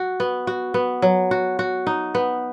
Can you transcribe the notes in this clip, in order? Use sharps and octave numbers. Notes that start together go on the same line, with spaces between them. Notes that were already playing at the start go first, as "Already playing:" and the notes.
Already playing: F#4
B3
F#4
B3
F#3
F#4
F#4
D#4
B3